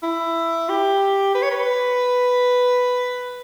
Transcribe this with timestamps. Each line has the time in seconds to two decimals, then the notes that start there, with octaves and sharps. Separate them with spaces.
0.03 E4
0.69 G4
1.35 B4
1.42 C#5
1.51 B4